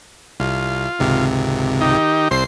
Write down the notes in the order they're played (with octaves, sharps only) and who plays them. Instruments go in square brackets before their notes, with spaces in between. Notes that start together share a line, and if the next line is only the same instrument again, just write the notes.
[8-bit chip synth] C2 [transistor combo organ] F4
[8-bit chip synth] G#1 C#2 C3
[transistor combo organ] D#3 D#4 G4
[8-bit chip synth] C2 C7 [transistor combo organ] C4 C5